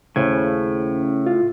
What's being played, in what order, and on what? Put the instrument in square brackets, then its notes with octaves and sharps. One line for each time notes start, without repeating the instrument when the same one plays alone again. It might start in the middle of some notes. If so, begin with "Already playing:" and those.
[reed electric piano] D#2 C5 G#6 [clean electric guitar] A2 [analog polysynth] C#3
[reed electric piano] F4